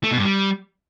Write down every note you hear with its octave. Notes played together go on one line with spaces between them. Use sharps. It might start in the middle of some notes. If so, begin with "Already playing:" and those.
A3
B2
G2
G3